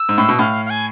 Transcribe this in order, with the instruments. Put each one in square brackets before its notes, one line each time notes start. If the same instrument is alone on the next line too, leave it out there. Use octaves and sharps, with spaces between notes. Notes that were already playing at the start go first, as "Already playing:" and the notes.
Already playing: [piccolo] E6
[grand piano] G#2
A2
B2
[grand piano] A2 [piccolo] F5
[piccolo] F5
G#5